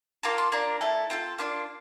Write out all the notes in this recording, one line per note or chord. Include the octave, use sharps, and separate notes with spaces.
A#3 F4 A4 A#5
C6
A#3 D4 F4 A#5
A3 E4 A4
C4 F4 A4
A#3 D4 F4 C6